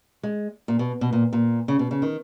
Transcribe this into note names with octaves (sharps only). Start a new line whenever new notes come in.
G#3
A#2
B2
B2
A#2
A#2
C#3
B2
C#3
D#3